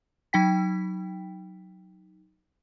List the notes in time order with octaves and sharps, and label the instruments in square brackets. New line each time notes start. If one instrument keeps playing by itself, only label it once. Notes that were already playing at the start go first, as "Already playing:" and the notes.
[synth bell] F#3 D#4 G5 B6